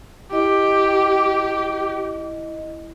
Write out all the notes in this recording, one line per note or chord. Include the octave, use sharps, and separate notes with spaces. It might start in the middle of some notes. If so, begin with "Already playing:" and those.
E4 G4 D#5